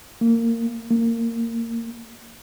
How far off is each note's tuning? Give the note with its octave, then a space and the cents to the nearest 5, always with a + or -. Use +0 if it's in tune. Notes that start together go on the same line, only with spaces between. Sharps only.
A#3 -20
A#3 -20